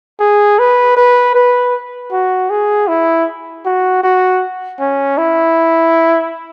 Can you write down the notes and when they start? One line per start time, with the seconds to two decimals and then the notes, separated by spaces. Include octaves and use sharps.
0.20 G#4
0.59 B4
0.97 B4
1.35 B4
2.12 F#4
2.50 G#4
2.88 E4
3.65 F#4
4.03 F#4
4.80 C#4
5.18 E4